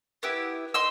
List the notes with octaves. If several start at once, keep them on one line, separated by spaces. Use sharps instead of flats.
B3 E4 G4
D#4 C6 E6